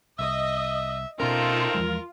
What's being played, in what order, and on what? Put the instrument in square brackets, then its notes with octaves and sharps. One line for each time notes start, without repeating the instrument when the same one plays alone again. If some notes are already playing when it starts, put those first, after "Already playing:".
[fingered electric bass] C2 [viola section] D#5 [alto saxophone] E5
[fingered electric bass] B2 C#4 [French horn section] A3 C4 D#4 [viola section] F4 [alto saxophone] A#4
[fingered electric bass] E2 F3 G#3